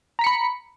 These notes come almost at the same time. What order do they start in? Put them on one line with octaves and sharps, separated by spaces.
A#5 B6 C#7 B5